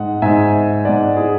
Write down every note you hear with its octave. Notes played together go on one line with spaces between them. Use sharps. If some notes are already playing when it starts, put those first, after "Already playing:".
Already playing: G#2 G#3 F#5
G#2 G#3 E5 G#5
G#2 G#3 D5 F#5
E4 G#4